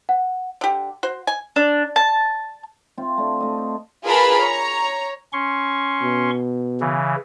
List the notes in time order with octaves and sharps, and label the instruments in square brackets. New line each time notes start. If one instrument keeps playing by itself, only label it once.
[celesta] F#5
[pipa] D3 G4
F#4 C5
G#5
[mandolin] D4
A5
[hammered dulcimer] C4 F4 E5 G5
D3 A3
A3 D#5
C5
[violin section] F4 G#4 A#4 B4 A5 B5
C#5 A#5
[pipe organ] C#4 C6 C#6
[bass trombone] B2
[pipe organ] C#3 E3